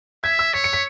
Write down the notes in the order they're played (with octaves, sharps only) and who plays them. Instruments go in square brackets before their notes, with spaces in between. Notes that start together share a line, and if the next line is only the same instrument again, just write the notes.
[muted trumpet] E5 [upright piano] G#6
[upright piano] E6
[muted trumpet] C#5 [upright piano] B6
[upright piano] C#7
B6